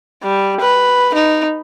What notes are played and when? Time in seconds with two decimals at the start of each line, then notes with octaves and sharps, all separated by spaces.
0.23 G3
0.60 B4
1.14 D#4